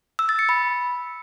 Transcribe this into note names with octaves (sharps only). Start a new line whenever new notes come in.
E6
A6
C#7
B5